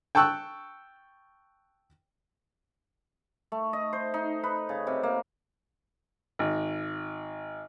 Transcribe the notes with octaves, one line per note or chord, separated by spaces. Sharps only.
G5 A5 C#6 E6 F#6
A3
D#5
C5
D#4
B4
C#3
C3
A#3
G#1